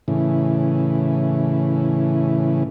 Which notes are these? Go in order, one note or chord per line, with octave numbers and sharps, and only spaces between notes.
A2 C#3 E3